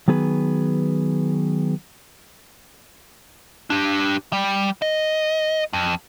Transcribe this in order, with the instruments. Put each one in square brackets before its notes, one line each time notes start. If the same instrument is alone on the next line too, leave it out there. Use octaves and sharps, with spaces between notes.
[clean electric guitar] D#3 F#3 B3 G#4 B4
[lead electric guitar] D4 G4
G3
D#5
F2